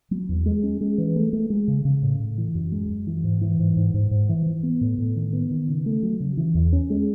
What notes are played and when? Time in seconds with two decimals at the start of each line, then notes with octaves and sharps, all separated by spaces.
0.11 F#3
0.29 E2
0.46 G#3
0.63 C#4
0.81 G#3
0.98 E3
1.16 A3
1.33 A3
1.50 G#3
1.68 C#3
1.85 C#3
2.02 A2
2.20 A2
2.38 E3
2.55 F#2
2.72 G#3
2.89 F#2
3.07 E3
3.24 G#2
3.41 E3
3.59 G#2
3.76 G#2
3.94 G#2
4.11 G#2
4.29 E3
4.46 E3
4.63 B3
4.81 A2
4.98 A2
5.16 D#3
5.33 B3
5.51 D#3
5.68 C#3
5.86 A3
6.03 F#3
6.20 C#3
6.37 E3
6.54 E2
6.73 C#4
6.90 G#3